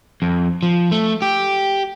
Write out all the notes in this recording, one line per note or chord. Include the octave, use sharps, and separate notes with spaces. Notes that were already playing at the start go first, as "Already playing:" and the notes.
F2
F3
A3
G4